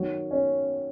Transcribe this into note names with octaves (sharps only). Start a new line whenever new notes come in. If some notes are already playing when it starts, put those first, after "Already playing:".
Already playing: D#3 F#3
C#4